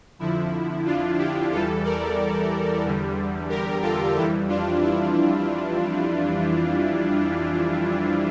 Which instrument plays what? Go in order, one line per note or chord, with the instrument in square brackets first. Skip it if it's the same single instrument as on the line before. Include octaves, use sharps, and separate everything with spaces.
[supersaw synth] F2 D3 F3 E4
D4 F4
E4 G4
E2 E3 G3 F4 A4
A#4 D5
E2 D3 G3
G4 A#4
F4 A4
F2 E3 G3 E4 G4
D4 F4
E4